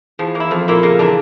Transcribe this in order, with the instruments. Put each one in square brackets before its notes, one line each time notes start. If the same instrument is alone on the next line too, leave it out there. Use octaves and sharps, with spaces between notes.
[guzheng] E2 [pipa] F3
[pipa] A#3
E4
[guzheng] F2 [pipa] F3
[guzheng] A#2 [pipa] A#3 E4
[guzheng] C#3 [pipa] A#3
[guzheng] E3 [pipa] D4 F4 A#4